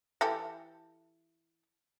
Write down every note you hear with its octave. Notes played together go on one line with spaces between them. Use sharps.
E3 G4 A4